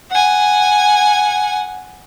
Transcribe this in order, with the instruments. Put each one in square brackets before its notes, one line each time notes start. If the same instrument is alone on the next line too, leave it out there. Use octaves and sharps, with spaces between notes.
[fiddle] F#5 G#5